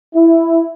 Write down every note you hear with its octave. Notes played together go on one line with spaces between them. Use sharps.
E4